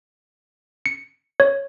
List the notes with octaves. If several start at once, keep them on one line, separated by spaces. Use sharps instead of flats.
C#7
C#5